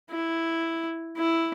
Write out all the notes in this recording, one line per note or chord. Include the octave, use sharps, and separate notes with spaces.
E4
E4